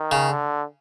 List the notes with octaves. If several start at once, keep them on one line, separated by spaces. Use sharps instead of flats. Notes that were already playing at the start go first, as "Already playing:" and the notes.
Already playing: D#3
C#3
D3